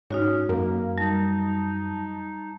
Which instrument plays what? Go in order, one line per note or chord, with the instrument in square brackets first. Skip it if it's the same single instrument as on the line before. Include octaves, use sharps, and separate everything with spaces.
[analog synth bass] G#2 [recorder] C#4 [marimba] D#4 F#4 C#5
[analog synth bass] F#2 [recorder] A#3 [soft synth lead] A#4
[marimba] G3 [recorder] D#4 [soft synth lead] A5